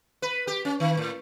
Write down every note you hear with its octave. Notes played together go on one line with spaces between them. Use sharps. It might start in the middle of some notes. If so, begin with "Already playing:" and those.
B4
G4
C#4
D#3
A2